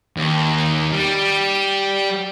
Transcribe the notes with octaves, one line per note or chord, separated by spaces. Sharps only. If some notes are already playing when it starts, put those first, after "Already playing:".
D#2
G3